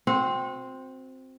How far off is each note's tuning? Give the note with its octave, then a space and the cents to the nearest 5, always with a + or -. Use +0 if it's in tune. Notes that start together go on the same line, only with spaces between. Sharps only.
C4 +0 F#4 -30